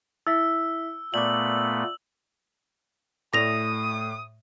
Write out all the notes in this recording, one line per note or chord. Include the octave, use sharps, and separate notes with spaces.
E4 E5 E6 B6
A#2 A3 B3 D5 D6 F#7
A2 A3 D5 D#6 A#6 F7